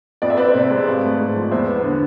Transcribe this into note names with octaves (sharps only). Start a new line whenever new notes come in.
F2 D5
E5
C4 B4 D5
C3
G#3
G#1
A3
G#2
F3
E2 C5 E5
B3
D3